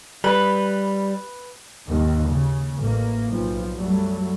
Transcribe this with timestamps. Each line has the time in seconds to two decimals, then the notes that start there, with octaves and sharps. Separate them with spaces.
0.24 G3 B4
1.88 D#2 G#2 D#3
2.26 C#3
2.78 A1 A#3
3.28 B1 F3
3.75 F#2 F#3 G3 A3